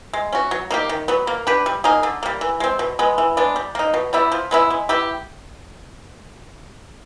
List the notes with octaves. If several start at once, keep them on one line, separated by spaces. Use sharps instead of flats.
G#3
C#4 F#4
F#3
A#3 D#4 G4
D#3
F#3 B3
A#3
D4 G4 B4
G3
A#3 D#4 G#4
D3
G3 A#3
E3
G#3 C4
B2
G#3 B3
E3
G#3 B3 D4
G3
A#3 D#4
B2
G3 B3 E4
F3
G#3 B3 E4
G#3
B3 E4 G4